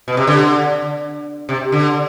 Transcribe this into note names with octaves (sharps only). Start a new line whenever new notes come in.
B2
C3
D3
C3
D3